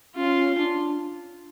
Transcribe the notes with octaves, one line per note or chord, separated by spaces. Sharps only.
C#4 F4
D4